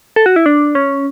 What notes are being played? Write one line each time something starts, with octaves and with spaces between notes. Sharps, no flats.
A4
F#4
E4
D4
C#4